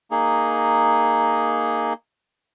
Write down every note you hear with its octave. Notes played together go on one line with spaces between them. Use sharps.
A#3 D#4 G#4